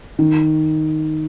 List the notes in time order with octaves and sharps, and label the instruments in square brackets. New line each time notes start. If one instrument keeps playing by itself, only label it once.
[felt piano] D#3